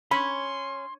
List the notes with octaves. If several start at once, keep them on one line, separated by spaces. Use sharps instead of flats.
C#4 B5 C6